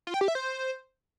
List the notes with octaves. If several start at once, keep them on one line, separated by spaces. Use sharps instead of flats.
F4
G5
G4
E5
C5